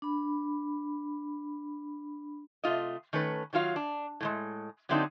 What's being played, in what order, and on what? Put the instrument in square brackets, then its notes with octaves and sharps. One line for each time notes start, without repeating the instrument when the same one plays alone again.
[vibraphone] D4 B5
[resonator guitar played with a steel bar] C3 A3 F4 D#5
D#3 A3 C#4 B4
D#3 F#3 F4 F5
D4
A2 G3 G#3
D3 F#3 A3 C4 D4 D#4